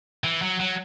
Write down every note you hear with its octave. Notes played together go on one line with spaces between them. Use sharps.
E3
F#3
F#3